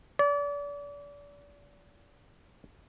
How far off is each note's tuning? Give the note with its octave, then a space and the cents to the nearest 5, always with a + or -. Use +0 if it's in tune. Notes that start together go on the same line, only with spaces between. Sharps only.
D5 -35